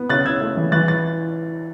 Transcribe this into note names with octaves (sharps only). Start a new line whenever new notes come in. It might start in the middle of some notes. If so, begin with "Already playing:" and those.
Already playing: B3
C#3 F#6 A6
C#3 E6 G#6
A3
E3
E3 F#6 A6
A6